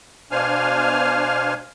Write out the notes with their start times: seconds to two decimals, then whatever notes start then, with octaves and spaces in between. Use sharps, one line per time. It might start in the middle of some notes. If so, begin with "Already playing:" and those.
0.31 B2 D4 C5 F5 G#5 F6